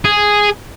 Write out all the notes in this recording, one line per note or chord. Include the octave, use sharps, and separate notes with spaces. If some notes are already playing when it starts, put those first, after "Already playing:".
G#4